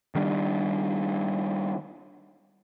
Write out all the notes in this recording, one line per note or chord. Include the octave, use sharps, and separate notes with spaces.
D#3 G3 D4